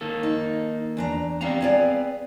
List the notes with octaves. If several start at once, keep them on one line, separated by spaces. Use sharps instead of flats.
D#3 A#3 A4
D#4
E2 D4 A#5
G3 B3 C4 F5 F#5 A#5
B3 G#4 D5